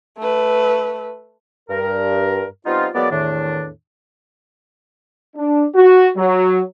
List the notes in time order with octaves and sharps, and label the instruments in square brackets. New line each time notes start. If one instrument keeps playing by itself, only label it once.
[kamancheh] A3 B4
[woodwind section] G2 A#4
G3 B3 C4 D#4 F4
F#3 G#3 A#3 B3 D5
E2 A2 D#3 D4
[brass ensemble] D4
F#4
F#3